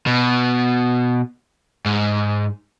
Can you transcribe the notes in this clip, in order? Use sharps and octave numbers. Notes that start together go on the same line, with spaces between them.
B2
G#2